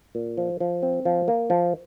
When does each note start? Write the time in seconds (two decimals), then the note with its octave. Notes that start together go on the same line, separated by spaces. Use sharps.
0.15 A#2
0.38 F3
0.60 F3
0.83 C4
1.05 F3
1.28 A#3
1.50 F3